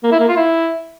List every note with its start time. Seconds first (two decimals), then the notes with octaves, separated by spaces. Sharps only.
0.03 A#3
0.12 E4
0.20 A#3
0.28 F4
0.37 E4